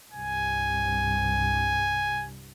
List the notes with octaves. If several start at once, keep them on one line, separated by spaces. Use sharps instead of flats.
C2 G2 G#5